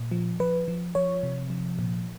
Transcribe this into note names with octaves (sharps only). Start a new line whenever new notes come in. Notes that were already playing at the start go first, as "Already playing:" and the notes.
Already playing: A#2
F3
F3 B4
F3
F3 C#5
C3
F3
A#2